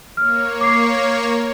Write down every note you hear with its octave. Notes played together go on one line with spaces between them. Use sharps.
A#3 C#5 F6
D6 C7